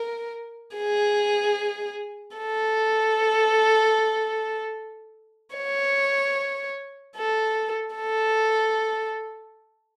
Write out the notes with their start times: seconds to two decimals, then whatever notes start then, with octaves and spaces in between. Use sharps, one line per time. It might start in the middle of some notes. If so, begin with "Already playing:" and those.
Already playing: A#4
0.78 G#4
2.37 A4
5.56 C#5
7.16 A4
7.96 A4